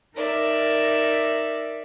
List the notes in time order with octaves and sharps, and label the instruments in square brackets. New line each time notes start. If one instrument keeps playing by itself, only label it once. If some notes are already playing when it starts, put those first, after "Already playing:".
[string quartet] D#4 A#4 D5 E5